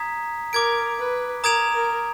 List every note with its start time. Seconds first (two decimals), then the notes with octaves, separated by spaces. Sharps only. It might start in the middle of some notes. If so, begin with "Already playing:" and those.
Already playing: A#5 D#6 G#6 B6
0.53 A#4 D6 G#6 D7
0.98 B4
1.43 A#4 A#5 D#6 G#6 D7 F7
1.74 A#4